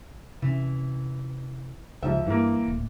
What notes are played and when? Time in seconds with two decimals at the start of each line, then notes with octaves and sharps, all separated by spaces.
0.42 C3 E3 C#4
2.03 C#2 G#2 F3 E5
2.26 G2 E3 A#3
2.68 D1 A2